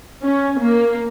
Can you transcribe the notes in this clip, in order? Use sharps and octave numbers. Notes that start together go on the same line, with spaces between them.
C#4
A#3